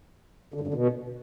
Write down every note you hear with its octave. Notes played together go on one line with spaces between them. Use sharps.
D3
G2
D3
B2